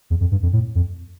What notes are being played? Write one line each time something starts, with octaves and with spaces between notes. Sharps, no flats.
E2
F2
G2
F2
A2
F2